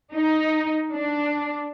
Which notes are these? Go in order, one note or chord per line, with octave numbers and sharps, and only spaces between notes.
D#4
D4